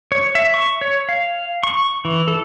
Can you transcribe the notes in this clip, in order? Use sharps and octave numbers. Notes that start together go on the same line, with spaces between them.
C#5
E5
C#6
C#5
F5
C#6
E3
A4